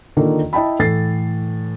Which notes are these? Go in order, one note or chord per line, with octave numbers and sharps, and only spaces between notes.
D3 D#3 A#3 F4 A4
E4 D#5 G5 A5 B5
A2 E3 A4 A6 C7